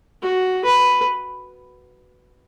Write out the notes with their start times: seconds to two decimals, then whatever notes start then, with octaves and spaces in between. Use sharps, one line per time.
0.22 F#4
0.64 B4